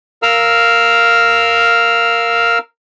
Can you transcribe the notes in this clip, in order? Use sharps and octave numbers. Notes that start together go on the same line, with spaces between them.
A#4 F5 E6 F6